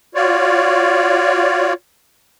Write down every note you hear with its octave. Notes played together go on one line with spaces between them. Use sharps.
F4 F#4 C#5 D5